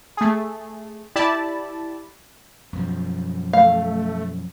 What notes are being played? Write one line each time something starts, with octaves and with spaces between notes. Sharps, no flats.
A3 G#4
E4 G4 D5 A5 B5
F#2 B2 F3
A3 F5